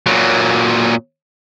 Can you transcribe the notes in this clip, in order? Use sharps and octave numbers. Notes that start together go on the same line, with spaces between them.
A#2 F#3